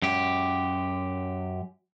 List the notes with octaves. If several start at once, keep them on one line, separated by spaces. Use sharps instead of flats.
F#2 G4